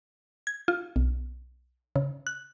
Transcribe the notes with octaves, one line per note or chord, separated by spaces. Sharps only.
G#6
F4
B1
C#3
F#6